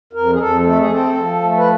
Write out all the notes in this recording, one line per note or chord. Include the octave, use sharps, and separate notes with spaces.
F2 A#4
G#4
F2 A4
A3 A4
G#4
C4 A4
F3
A3
B4